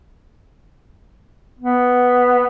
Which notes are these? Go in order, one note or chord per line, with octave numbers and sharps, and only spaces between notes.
B3